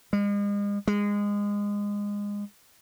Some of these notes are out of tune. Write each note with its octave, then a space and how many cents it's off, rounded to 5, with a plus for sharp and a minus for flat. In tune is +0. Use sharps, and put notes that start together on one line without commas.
G#3 -40
G#3 -20